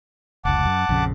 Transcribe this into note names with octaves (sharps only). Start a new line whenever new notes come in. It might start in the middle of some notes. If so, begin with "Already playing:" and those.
F1 C#2 F#5 A5 D6
F#2
A#1 F2 C#3